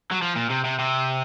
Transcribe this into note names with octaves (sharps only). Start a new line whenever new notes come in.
F#3
F3
A#2
C3
C3
C3